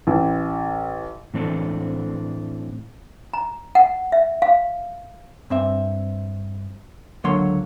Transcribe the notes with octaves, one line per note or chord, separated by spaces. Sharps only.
A1
A2 E3 C4 D4 A4
A#5
F#5
E5
F5
G2 C4 E5
C#2 D3 F#3 A#3 C#5 C6